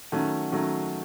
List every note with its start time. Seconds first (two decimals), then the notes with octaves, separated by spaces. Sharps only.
0.12 D#3 F#3 A3 C#4 F#5
0.52 D#3 F#3 A3 C#4